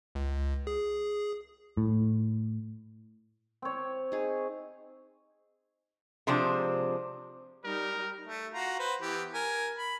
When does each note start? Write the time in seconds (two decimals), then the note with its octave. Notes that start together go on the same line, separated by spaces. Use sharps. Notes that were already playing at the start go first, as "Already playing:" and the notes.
0.15 C#2
0.67 G#4
1.77 A2
3.62 C4 C#5
4.12 D#4 G#4
6.27 C3 F3 G#3 C4 D4
7.64 G3 D#4 A#4
8.27 A3
8.54 F4 F#4 A#5
8.79 B4 C5
9.02 E3 B3 G4
9.34 A#4 G#5
9.78 B5